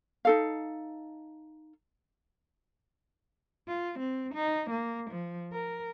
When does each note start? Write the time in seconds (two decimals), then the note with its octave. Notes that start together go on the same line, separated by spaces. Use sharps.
0.25 D#4 A4 F5
3.68 F4
3.99 C4
4.35 D#4
4.70 A#3
5.10 F3
5.53 A#4